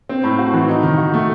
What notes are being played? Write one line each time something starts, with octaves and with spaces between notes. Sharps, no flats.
C4
A2
F#4
E3
D#4
D#3
F#4
A3